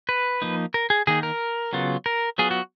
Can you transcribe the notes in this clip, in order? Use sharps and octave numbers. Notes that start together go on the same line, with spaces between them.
B4
F3 A#3 D#4
A#4
G#4
D#3 A#3 D#4 G#4
A#4
C#3 F#3 B3 F4
A#4
F#3 B3 F4 G#4
F#4